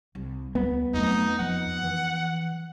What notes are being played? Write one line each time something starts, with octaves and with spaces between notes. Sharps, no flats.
C2
D2 G3 B3
F2 F#3 A3 D#4
F3 D#4 F#5
E3